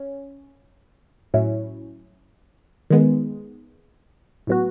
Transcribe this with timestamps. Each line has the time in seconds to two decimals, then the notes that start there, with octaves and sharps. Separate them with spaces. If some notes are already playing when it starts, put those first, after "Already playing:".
Already playing: C#4
1.34 A2 F#3 C#4 E4
2.90 D#3 G#3 B3
4.47 A2 F#3 B3 F#4